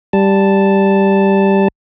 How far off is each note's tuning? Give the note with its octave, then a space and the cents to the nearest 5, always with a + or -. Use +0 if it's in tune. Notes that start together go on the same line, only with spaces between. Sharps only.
G3 +0 A5 +0